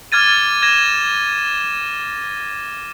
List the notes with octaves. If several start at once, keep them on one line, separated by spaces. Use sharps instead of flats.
D6 F6 G#6 A6 D#7
G#6 A#6 E7